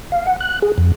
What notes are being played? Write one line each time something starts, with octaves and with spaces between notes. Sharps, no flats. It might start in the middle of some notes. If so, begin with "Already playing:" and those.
F5
F#5
F#6
G#4
F2